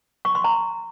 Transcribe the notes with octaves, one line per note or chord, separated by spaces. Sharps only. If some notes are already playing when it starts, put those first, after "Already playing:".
C#6
C6
A#5